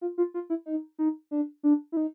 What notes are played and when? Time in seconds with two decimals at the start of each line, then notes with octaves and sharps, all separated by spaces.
0.01 F4
0.18 F4
0.34 F4
0.50 E4
0.66 D#4
0.99 D#4
1.31 D4
1.63 D4
1.92 E4
1.97 D#4